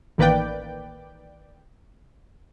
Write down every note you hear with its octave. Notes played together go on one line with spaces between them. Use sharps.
A1 D#3 A#3 B4 D5 G5